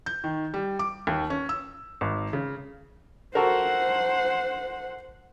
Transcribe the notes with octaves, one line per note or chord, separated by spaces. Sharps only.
G6
D#3
G3
D6
D#2
C#4
E6
G#1
C#3
F#4 A4 A#4 C5 F#5